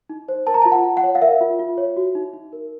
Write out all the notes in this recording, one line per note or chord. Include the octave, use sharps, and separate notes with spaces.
D#4
C5
A#4 A5
A#5
F4 A5
F#5
F4
F#5
C#5
F5
A#4 E5
F4
F4
C#5
F#4
D#4
D#4
A#4